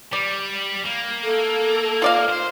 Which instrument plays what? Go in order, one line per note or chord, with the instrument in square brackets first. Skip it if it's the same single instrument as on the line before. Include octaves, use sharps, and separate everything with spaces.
[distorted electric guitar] G3 [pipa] D5
[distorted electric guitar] A#3
[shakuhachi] A4
[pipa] F4 D5 F5
[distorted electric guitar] C5